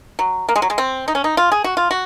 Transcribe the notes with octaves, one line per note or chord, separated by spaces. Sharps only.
F#3
A#3
G#3
F#3
G#3
C4
D#4
C#4
D#4
F4
G#4
F#4
F4
F#4